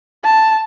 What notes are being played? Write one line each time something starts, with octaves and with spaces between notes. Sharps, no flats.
A5